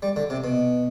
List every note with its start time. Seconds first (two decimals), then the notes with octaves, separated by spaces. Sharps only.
0.02 G3
0.16 D3
0.30 C3
0.44 B2